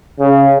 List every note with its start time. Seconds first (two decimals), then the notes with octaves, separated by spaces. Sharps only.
0.19 C#3